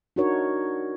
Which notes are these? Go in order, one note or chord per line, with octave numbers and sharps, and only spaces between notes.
D4 D#4 F#4 A#4 C#5